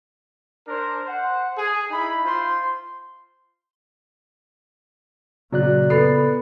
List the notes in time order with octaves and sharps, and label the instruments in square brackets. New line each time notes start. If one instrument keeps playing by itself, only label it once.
[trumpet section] D4 A#4 C5
C5 F#5
G#4
D#4 E4 B5
F4 C5 C6
[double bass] A#2 [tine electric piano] C#3 D5 F#6 [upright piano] F#3
[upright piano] B3 C7 [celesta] A4 B5 A6